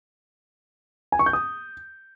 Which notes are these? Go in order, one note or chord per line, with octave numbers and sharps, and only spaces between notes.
G#5
C#6
G6
D#6